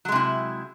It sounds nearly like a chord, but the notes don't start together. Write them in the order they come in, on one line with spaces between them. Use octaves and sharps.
F#3 G#3 C3 E4